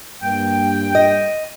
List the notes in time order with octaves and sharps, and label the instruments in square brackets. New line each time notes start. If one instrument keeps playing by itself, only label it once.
[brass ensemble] G2 A#3 [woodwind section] G5
[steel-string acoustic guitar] D#5